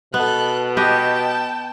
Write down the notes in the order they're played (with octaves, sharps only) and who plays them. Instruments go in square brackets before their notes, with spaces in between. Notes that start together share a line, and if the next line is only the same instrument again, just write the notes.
[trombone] B2 [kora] B3 [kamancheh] A4 F#6
[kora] B3 G4 D#5 [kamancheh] G5 A5